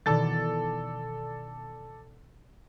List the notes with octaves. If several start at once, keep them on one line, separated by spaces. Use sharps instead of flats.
B2 D#3 E3 A4 D5 A6